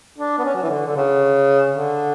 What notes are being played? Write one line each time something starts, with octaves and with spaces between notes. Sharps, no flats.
D4
B3
C#4
F#3
E3
D3
D3
C#3
D3